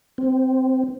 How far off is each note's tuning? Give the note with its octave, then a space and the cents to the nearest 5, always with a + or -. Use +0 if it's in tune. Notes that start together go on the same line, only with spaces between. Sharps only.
C4 -10